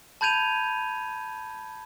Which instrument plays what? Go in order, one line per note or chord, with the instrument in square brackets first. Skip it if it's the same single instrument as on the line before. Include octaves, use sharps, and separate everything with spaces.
[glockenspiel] A5 B5 G6 G#6 D#7 F7